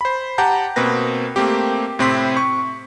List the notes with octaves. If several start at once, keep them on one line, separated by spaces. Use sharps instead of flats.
C5 B5
G4 F#5 A5 A#5 G6
B2 A#3 C4 B4 A#6
A3 A#3 C4 G4
A2 C3 C4 E4 C6 B6
C#6